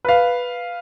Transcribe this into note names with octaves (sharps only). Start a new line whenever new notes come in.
B4 F5